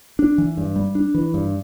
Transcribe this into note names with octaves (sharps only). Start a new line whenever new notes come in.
D4
E3
G2
G3
D4
E3
G2